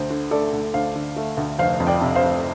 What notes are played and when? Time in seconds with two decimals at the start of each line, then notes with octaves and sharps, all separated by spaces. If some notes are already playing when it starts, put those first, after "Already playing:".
Already playing: D2 C5
0.10 D3
0.31 A3 A4 D5
0.52 D2
0.74 D2 C5 F5
0.95 D3
1.16 A3
1.37 D2
1.59 F1 C5 F5
1.80 F2
1.87 D5 G5
2.01 C3
2.15 C5 F5
2.23 F1